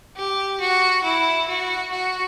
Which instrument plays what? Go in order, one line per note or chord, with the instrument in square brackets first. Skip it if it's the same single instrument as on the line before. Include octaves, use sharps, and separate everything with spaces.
[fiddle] G4
F#4
E4
F#4
F#4